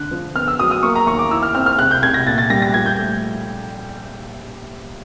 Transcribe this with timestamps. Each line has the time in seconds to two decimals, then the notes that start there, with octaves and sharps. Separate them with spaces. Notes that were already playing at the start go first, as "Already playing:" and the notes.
Already playing: D3 F#6
0.11 F3
0.35 B3 F6
0.48 E6
0.59 F#3 D#6
0.71 D#6
0.83 A#3 C#6
0.95 A#5
1.07 D#2 C#6
1.19 D6
1.31 E4 E6
1.43 F6
1.55 C4 F6
1.66 F6
1.79 C2 F#6
1.91 G6
2.03 C2 G#6
2.14 A#6
2.26 A#2 A6
2.38 A6
2.50 G3 A#6
2.62 A#6
2.74 F3 G#6
2.86 G6
2.98 A3